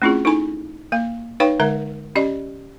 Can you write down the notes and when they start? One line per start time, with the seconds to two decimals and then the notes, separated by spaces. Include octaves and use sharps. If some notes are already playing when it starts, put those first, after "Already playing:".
0.02 A3 C4 C#4 E4 F4 G#4
0.25 D#4 E4 A4 G#5 B5
0.92 A#3 F5
1.40 D#4 B4 C#5 F5 G5 B5
1.60 D3 G#3 A#4 E5
2.16 C#4 G4 D5 D#5